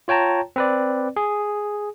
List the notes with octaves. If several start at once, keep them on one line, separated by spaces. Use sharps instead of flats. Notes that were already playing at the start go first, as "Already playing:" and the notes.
F4 C#5 G5 A5 A#5
C4 B4 D5
G#4